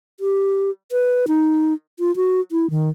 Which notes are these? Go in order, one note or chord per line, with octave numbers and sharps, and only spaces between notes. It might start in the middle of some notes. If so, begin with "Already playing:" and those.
G4
B4
D#4
F4
F#4
E4
D#3